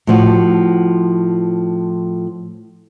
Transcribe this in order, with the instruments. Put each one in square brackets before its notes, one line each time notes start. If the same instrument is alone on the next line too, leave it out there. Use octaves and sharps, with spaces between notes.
[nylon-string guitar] A2 F3 F#4